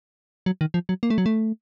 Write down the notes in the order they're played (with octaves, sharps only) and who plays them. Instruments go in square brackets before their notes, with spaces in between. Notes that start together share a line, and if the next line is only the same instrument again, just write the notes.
[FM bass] F#3
D#3
F3
F#3
A#3
A3
F#3
A3